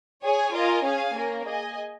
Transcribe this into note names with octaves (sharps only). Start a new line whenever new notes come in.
G#4 C#5 G#5
F4 A#4 D#5 G#5
C#4 G#4 F5 G#5
A#3 C#4 A#4
G#4 D#5 G#5